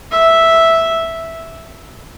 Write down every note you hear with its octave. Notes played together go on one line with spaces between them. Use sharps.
E5